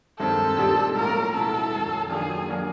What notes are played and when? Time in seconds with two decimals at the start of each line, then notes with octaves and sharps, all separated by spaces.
0.19 G2 D#3 G#3 C4 A4
0.57 A#2 G3 C4 D#4 G4
0.95 A2 F3 A3 C#4 F4 A#4
1.33 B2 G#3 B3 E4 A4
1.72 F#2 D#3 F#3
2.09 D#3 F#3 A#3 D4 F4 G#4
2.48 F#3 A#3 D4